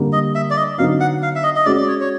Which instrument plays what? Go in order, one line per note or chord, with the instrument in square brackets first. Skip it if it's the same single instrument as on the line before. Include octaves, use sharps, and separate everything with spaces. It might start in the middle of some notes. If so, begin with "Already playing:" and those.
Already playing: [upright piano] D3 G3 A#3
[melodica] D#5
E5
D5
D#5
[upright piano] D3 F#3 B3 D#4 [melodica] F5
[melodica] F#5
F5
E5
D#5
D#5
[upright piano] G#3 C#4 F#4 [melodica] D5
[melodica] D5
C#5
C#5